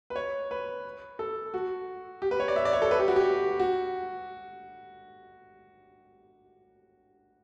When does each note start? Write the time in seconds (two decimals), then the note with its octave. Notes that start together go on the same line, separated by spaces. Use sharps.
0.10 B4
0.16 C#5
0.51 B4
1.19 A4
1.54 F#4
2.22 G4
2.31 B4
2.40 C#5
2.48 D5
2.56 E5
2.65 D5
2.73 C#5
2.82 A4
2.91 B4
3.00 G4
3.08 F#4
3.16 G4
3.60 F#4